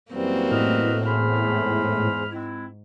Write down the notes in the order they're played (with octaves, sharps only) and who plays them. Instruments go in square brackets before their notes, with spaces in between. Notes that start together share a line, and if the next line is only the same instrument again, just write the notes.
[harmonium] F#2 E3 G3 [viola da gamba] A#3 C4 F#4
[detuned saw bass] A2 [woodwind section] B4 D#5 F6
[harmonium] E2 G#4 C5 [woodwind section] B5 F6
[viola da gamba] G#2
[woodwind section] G#3 C4 E4